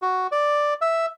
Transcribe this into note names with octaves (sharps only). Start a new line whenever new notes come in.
F#4
D5
E5